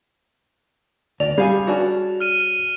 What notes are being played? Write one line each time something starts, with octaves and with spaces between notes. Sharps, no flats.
D2 D5 F7
G3 G#4 F5 G#5
C#4 D4 F#4
F6 D#7